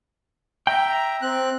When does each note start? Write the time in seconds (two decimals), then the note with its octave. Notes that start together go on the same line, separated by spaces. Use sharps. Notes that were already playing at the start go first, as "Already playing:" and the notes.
0.67 E5 G5 A#5
1.22 C4 F#6